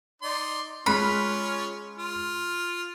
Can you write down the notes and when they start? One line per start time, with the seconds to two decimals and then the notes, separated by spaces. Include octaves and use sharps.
0.22 D#4 D5 C6
0.86 G#3 C#4 F4 B5 F#6
1.97 F4